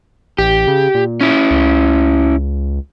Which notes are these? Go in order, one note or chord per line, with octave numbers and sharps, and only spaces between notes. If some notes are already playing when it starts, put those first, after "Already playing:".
A1 G4
C#3
A#2
C#4 E4
C#2